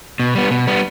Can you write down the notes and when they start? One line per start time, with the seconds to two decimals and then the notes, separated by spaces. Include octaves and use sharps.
0.20 B2
0.35 G3 B3
0.51 B2
0.67 G3 B3